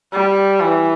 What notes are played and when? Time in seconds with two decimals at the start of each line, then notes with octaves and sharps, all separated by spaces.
0.12 G3
0.60 E3